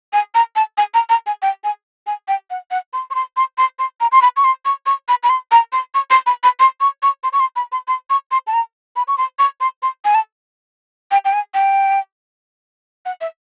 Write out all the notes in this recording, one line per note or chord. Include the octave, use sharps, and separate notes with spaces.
G#5
A#5
A5
G#5
A#5
A#5
G#5
G5
G#5
G#5
G5
F#5
F#5
C6
C#6
C6
C6
C6
C6
A#5
C6
B5
C#6
C6
C#6
C#6
B5
B5
C6
A#5
C6
C#6
C6
B5
B5
C6
C#6
C#6
C6
C#6
C6
B5
C6
C6
C#6
C6
A5
A#5
B5
C#6
C6
C#6
C6
C6
G#5
A5
G5
G5
G#5
G5
F#5
E5